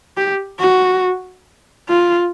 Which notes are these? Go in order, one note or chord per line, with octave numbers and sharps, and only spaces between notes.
G4
F#4
F4